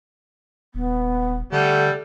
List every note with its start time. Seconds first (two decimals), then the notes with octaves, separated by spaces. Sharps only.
0.75 D#1 B3
1.52 D3 G3 A3 A4 F#5